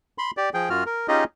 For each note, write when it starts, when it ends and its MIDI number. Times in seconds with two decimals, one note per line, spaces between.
0.18 0.31 83
0.18 0.31 84
0.37 0.50 67
0.37 0.50 74
0.54 0.69 53
0.54 0.69 68
0.54 0.69 79
0.70 0.84 42
0.70 0.84 65
0.70 0.84 66
0.70 0.84 89
0.86 1.07 70
1.08 1.24 61
1.08 1.24 63
1.08 1.24 65
1.08 1.24 67
1.08 1.24 68
1.08 1.24 75